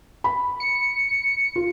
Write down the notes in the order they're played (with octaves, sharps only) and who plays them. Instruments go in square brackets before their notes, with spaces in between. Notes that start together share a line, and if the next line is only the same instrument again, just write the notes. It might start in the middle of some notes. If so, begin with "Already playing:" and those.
[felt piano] B5
[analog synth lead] C#7
[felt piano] F4